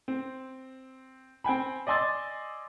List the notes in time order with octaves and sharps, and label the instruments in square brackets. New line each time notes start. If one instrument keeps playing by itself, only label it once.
[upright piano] C4
C4 G5 G#5 B5
D5 D#5 G#5 C6 E6 A6